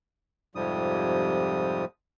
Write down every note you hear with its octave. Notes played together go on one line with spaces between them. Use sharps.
F2 G#2 C3 F3 G3 D#6